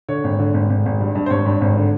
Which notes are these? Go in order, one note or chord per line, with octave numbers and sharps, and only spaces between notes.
D3 C#5
G#1
D3
G#1
G#1
G#1
G2
G2
C5
G#1 C#5
G2
G#1
D3